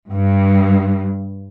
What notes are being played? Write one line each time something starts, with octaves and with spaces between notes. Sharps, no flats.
G2